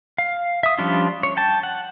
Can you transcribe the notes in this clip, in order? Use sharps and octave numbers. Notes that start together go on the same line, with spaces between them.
F5
E5 D#6
F3 G3 C#4 D4 F4
C#5
G5 A5
F#5